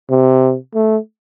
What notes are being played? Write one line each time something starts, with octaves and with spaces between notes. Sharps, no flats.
C3
A3